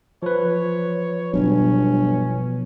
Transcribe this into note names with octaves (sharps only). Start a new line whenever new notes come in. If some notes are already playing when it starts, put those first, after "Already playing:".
F3 B4 C#5
G1 B2 F#3 C#4